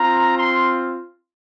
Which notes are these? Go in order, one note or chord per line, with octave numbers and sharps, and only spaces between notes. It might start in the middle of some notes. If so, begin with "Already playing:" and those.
Already playing: C4 F4 A#5
C6